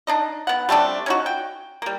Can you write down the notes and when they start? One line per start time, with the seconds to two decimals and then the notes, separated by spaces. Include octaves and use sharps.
0.07 D4 D#4 D#5
0.47 B3 F#5
0.69 G3 A3 C4 D4
1.06 C#4 D#4 F#4
1.26 G5
1.82 G3 A#3